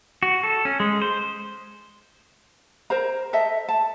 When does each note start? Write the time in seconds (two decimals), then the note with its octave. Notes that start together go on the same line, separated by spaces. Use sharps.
0.23 F#4
0.43 A4
0.65 C#4
0.80 G#3
1.02 C5
2.90 A#4 C5 A#5
3.33 A4 D#5 E5
3.69 A5